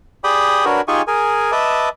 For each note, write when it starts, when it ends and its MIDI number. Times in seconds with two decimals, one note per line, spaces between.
0.24 0.65 67
0.24 0.65 68
0.24 0.65 74
0.24 0.65 79
0.24 0.65 83
0.24 0.65 87
0.65 0.81 62
0.65 0.81 66
0.65 0.81 70
0.65 0.81 71
0.65 0.81 73
0.88 1.02 63
0.88 1.02 65
0.88 1.02 67
0.88 1.02 68
0.88 1.02 80
0.88 1.02 85
1.07 1.51 68
1.07 1.51 70
1.07 1.51 80
1.52 1.89 71
1.52 1.89 75
1.52 1.89 76
1.52 1.89 81
1.52 1.89 86